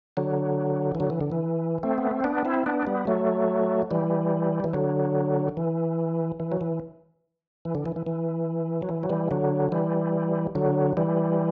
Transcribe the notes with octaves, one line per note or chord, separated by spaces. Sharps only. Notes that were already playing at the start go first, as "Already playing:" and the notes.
D3 F#3
E3
D3 F#3
E3
D3
E3
A3 C4
B3
C4
B3 D4
C4 E4
B3 D4
G3 B3
F#3 A3
E3 G3
E3
D3 F#3
E3
E3
F#3
E3
E3
D3
E3
E3
E3
F#3
E3
F#3
E3 G3
D3 F#3
E3 G3
D3 F#3
E3 G3